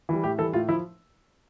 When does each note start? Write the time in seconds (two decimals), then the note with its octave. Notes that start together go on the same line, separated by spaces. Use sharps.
0.09 E3 G3
0.23 A2 G4
0.38 E3 G3 A4
0.53 A2 F4
0.69 F3 E4